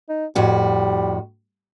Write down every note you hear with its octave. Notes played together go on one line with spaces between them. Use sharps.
D#4
F2 A2 G3 F#4